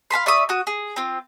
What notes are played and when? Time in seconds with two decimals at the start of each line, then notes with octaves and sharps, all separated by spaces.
0.10 F5 A5 B5 C6
0.26 D5 E5 C#6 D#6
0.49 F#4 D#6
0.67 G#4
0.96 C4 F4